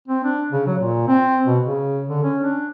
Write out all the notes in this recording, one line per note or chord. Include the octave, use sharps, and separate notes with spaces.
C4
D4
C#3
F#3
A#2
C4
B2
C#3
D3
C#4
D4